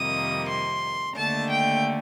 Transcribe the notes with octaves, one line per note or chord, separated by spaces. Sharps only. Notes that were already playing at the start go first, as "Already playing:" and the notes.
Already playing: F2 C3 D#3 G3 A#3 D#6
C6
D#2 D3 A3 D4 A5
G5